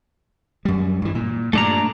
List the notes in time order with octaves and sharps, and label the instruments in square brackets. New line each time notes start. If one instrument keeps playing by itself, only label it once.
[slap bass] F#2 G3
G2 E3
A#2
[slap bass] G2 A#2 [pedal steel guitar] A3 D4 A#5